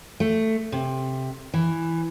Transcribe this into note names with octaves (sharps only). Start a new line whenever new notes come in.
A3
C3
E3